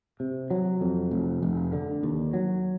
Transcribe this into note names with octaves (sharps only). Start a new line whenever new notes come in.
C3
F#3
F2
F1
F1
D3
D#2
F#3